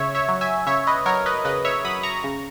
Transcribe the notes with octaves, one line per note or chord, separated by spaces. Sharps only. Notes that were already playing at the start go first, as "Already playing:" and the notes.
Already playing: C#3 C#5 E5
C#5 E5
F#3
E5 G#5
C#3 C#5 E5
B4 D#5
F#3 A#4 C#5
B4 D#5
C#3 B4 D#5
C#5 E5
F#3 B5 D#6
A#5 C#6
C#3